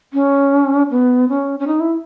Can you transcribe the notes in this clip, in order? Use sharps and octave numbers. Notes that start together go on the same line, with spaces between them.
C#4
B3
C#4
C#4
D#4
E4